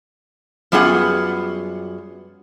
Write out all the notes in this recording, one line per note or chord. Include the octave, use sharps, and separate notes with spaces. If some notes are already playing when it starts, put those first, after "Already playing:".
F#2 G3 B3 F4 G#4 F#5